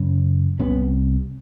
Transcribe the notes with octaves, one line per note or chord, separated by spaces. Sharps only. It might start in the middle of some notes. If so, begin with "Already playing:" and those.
Already playing: F#2 C#3
C2 C3 B3 C#4